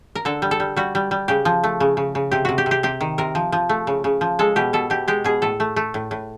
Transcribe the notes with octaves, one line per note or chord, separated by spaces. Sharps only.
A#4
D3 A4
G3
A4
G3
G3 F#4
G3
G3
C#3 G4
F3
A3
C#3
C#3
C#3
C3 G4
C3 F#4
G4
C3
G4
C3 G4
D#3
C3 A#4
F3
F3
A3
C#3
C#3
F3
G#3 A4
B2 G4
B2 A4
B2 G4
G#3 G4
B2 G#4
A2 A4
A3
A3
A2
A2